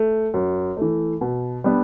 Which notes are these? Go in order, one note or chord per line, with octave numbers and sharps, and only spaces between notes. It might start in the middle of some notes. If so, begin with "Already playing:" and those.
Already playing: A3
F#2
E3 A3
B2
G3 B3 D4